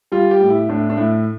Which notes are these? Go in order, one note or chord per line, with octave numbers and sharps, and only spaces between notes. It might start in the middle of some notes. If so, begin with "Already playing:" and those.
G3 F4
G4
A2
E4
A2 D4
D4
A2 E4